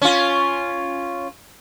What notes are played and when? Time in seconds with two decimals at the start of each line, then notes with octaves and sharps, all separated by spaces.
0.02 C#4 F4